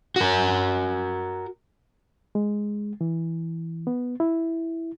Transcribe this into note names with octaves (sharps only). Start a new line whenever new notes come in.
F#4 A#4
G#3
E3
B3
E4